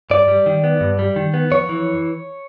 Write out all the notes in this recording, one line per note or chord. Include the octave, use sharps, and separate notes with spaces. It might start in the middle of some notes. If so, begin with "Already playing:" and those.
G2 D5
G3
D#3
B3
G2
G3
D#3
B3
F2 C#5
E3